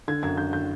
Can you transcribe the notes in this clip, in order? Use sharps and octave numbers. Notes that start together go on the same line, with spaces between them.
D3 G#6
F#2 G#6
D3 G6
D3 G6